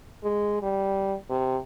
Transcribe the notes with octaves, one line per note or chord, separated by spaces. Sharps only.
G#3
G3
C3